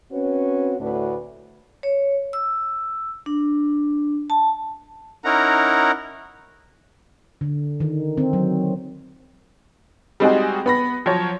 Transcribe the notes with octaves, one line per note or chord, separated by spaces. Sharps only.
C4 C#4 F#4 B4 C#5
D2 A2 D4 F#4 B4
C#5
E6
D4
A5
C#4 D#4 E4 A#4 F#5 A#5
D3
D#3
C4
F#3
G3 G#3 C4 D#4 F#4 G#4
B3 B5 A#6
F3 F#3 C#5